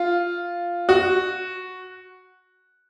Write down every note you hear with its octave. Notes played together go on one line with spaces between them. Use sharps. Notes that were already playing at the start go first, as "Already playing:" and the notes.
Already playing: F4
F#4